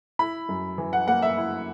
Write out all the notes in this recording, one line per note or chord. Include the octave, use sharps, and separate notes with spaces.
E4 B5
F#2
E3
F#5
A#3 F#5
E5
E4